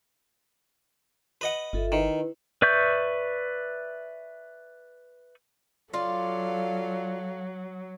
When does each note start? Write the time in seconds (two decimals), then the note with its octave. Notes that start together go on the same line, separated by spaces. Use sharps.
1.41 B4 D#5 F#5
1.73 G1 F4 A4 E5
1.92 D#3 E4 B4
2.62 B4 D5 E5 C#6 G6
5.94 F#3 F4 A4 D5 F5